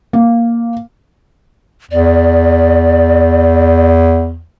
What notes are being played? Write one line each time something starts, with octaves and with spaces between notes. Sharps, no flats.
A#3
E2 D5